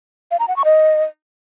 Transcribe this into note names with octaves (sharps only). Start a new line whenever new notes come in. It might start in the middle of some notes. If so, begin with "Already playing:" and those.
F5
A#5
F#5
C#6
D#5